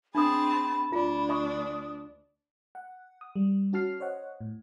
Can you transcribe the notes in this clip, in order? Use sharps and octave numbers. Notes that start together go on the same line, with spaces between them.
C4 D4 G#4 A5 B5 D#6
D2 D4 F4
D#5 B5 C#6 D#6
F#5
D#6
G3
C#4 F#4 A5 F6 C7
C5 C#5 D#5 F#5
A2